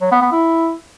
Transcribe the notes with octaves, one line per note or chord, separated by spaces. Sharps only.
F#3
B3
B3
E4